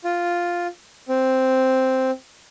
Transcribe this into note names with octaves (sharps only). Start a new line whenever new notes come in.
F4
C4